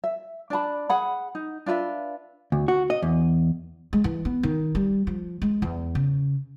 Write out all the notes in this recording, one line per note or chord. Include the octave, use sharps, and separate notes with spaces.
E5
D4 D5 A5 B5
G#4 F#5 B5
D#4
D4 F4 B4 E5
D2
F#4
D#5
E2
G#3
E3
B3
D#3
G3
F3
G#3
E2
C#3